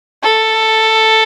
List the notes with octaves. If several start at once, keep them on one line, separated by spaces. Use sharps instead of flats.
A4